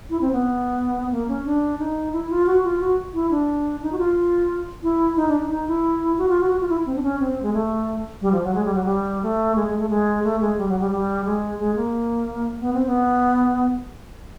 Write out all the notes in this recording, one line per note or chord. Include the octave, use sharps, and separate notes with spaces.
E4
C4
B3
A#3
C#4
D4
D#4
E4
F4
F#4
F4
F#4
E4
D4
D#4
F#4
F4
E4
D#4
D4
D#4
D#4
E4
F#4
F4
F#4
F#4
F4
E4
C4
D4
C#4
C4
G#3
A3
G3
F3
F#3
G#3
G3
F#3
G3
A3
G#3
G#3
A3
G#3
A3
G#3
G3
F#3
G3
G3
G#3
G#3
A#3
B3
C4
B3